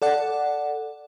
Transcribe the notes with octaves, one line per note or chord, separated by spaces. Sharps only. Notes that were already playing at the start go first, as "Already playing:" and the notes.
A4 D5 F#5